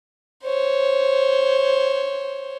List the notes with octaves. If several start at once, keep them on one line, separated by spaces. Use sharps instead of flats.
C5 C#5